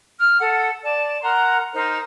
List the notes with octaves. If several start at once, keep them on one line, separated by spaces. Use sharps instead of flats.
F6
A4 F#5
D5 A5
A#4 F#5 A#5 C6
D#4 A#4 C5